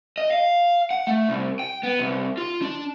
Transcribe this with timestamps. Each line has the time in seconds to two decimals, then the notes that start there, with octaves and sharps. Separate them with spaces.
0.18 D#5
0.31 F5
0.91 F#5
1.07 A3
1.29 C2
1.59 G5
1.83 B3
1.99 C2
2.38 F4
2.62 D4